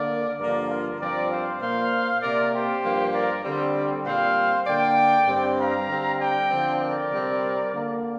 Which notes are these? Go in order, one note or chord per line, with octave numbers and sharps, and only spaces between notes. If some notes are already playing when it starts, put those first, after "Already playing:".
Already playing: D3 A#3 A#4 D5
G2 D3 F3 A#3 A#4 D5
F4 A#4
G2 F3 C4 A#4 D5
C5 F5
A#2 A#3 C5 F5
C3 A#3 A#4 D5
G4 C5
G2 F3 A#3
A#4 D5
D3 G3 C4
A#2 G3 C4 C5 F5
D3 A#3 D5 G5
G2 G3 C4
F5 A#5
D3 G3 C4
D5 G5
D3 F3 C4
A#4 D5
C3 G3 C4
D3 A#3